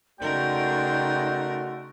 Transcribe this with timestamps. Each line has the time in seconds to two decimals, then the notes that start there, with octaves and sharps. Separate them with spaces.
0.20 C#3 A3 D#4 F#4 A#4 D5 G5 C6